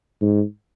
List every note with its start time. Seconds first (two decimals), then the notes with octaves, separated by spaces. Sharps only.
0.21 G#2